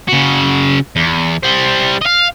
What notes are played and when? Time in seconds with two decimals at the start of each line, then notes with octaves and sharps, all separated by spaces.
0.08 C#3 F#4
0.96 E2
1.43 G3 C5
2.02 D#5 F5